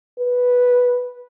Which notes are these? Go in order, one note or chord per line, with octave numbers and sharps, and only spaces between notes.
B4